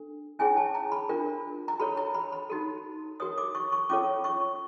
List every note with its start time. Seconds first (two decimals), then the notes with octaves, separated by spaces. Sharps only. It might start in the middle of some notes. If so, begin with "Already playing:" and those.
Already playing: D4 A4
0.39 C#4 E4 G#4 C#5 G#5
0.57 A5
0.75 A#5
0.92 B5
1.09 D4 F4 A#4
1.68 A#5
1.80 F#4 A4 C#5 B5
1.97 A#5
2.14 B5
2.32 B5
2.50 D#4 F#4 A4
3.20 F#4 A#4 C#5 D#6
3.38 D6
3.55 C#6
3.72 C#6
3.90 C#4 F4 A4 C#5 D6
4.24 C#6